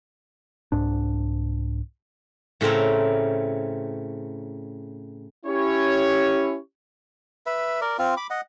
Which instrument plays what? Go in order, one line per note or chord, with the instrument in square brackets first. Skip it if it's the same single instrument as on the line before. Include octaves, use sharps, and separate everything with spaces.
[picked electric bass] C2 G#2 D4
[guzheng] A2 C#3 A3 C4 A#4
[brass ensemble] C#4 E4 G4 C#5
[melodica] B4 E5
A#4 D5
C4 F4
B5 D6
D#5 F#5